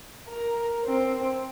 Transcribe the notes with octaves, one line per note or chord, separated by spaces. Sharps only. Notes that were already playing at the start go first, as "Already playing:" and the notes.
A#4
C4